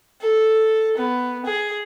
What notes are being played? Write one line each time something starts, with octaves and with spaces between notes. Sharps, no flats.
A4
B3
G#4